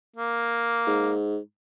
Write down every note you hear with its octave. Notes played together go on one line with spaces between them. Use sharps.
A#3
G#2